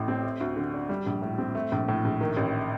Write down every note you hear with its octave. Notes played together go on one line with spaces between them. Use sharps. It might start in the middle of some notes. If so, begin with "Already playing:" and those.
Already playing: A1 A2 A3
C4
A3
D2
D3
D4
G3
A#1
A2
C4
A3
A#1
A2
A#1
D#3
A1